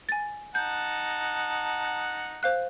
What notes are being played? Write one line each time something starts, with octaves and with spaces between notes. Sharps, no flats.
G#5 A6
D#4 F#5 A5 G6
C5 F5 F#6